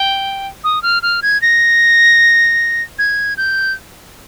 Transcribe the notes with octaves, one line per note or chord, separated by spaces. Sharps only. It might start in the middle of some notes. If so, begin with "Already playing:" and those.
Already playing: G5
D#6
F6
F6
G#6
A#6
G#6
G6